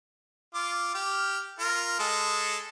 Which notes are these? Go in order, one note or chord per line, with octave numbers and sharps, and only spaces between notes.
F4 D6
G4 F6
F4 A#4
G#3 A4